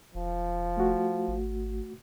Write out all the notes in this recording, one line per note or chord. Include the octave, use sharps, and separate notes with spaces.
E1 F3
A3 F#4
G#1